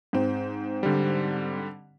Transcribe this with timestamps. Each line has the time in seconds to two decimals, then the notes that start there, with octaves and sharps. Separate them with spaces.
0.13 G#2 C4
0.83 D3 G3